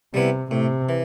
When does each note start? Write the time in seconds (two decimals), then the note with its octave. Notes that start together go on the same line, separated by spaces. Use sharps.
0.14 C3 G3 B3 E4
0.51 A2 C3
0.89 E3